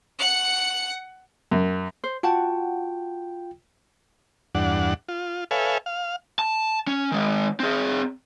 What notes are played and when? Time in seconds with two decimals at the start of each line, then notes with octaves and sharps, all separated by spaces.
0.19 F#5 C#7
1.51 F#2
2.04 C5
2.23 F4 F#4 F#5 G5 A5
4.55 E2 G2 D4 F#5
5.08 F4
5.51 A4 B4 C#5 E5 F5 G#5
5.86 F5
6.39 A5
6.87 C#4
7.12 D#3 G#3
7.60 C4 G#4